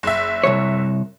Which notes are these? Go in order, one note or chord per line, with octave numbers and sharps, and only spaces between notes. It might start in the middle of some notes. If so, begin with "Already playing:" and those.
F#1 E5
C2 F2 C#5